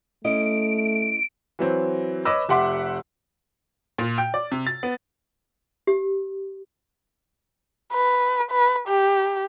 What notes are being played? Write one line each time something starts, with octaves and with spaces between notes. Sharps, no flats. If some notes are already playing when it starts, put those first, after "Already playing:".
A3 C#4 E4 D#5 D7
E3 F#3 C4
B4 C#5 D#5 B5 D6 E6
F1 G4 E5 F#5 C6 D6
A#2
G5
D5
C3
A6
B3
G4
B4
B4
G4